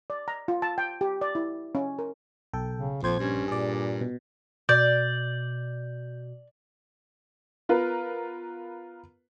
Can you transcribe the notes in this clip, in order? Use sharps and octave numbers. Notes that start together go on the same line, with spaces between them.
D5
A#5
F4
A5
G5
G4
D5
E4
C#4
A#4
B1 A4 G5
C#3
A#1 F2 F3 C5 G#6
G2 C#4
A#2 G#4 D5
B2
B2 D5 G6
B3 F4 A#4 B4